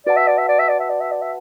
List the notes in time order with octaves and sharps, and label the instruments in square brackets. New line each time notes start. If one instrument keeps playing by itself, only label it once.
[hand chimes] F#4 B4 F#5 A5 [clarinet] D5
[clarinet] E5
D5
E5
D5
E5
D5
E5
D5
E5
D5
E5